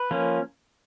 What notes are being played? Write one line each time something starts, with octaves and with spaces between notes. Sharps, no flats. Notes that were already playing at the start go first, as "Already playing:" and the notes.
Already playing: B4
F3 A#3 C#4